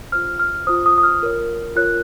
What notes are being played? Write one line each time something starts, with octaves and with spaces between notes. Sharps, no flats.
F4 C5 F6
F6
F4 C5 D#6
D#6
D#6
F6
F4 A#4 C#5
F4 A#4 C#5 F#6